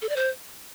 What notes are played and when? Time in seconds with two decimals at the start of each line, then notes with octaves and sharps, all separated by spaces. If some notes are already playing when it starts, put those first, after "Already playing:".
0.01 A4
0.09 D5
0.16 C5